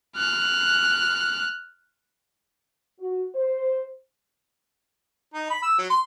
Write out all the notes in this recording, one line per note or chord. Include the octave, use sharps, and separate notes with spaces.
F6 F#6
F#4
C5
D#4
B5
E6
F#3
C6